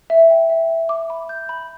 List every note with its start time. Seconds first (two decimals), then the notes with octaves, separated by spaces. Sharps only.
0.10 E5
0.30 G5
0.50 E5
0.70 E5
0.89 D6
1.10 B5
1.29 G6
1.49 B5